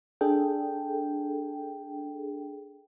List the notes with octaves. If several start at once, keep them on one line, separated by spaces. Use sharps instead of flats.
D4 G#4 A4 G5